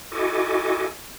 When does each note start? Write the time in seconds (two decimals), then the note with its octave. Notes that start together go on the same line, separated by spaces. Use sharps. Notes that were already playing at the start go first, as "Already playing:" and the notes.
0.12 E4 F#4 A4 D#5 G#5 D6